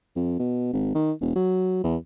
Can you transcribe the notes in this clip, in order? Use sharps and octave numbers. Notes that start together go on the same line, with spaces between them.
F2
B2
G#1
D#3
E1
F#3
E2